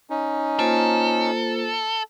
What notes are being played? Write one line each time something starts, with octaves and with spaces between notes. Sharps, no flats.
C#4 D#4
A#3 F4 A4 C5